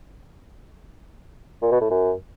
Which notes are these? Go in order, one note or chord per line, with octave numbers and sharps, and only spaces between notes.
A#2
B2
A2
F#2